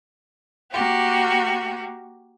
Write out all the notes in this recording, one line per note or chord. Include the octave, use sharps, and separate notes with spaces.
A#3 F#4 G4